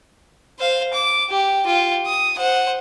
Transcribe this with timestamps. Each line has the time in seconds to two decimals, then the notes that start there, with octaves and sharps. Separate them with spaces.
0.59 C5 F5
0.94 D6
1.30 G4
1.67 F4 G4
2.06 D#6
2.38 C5 F#5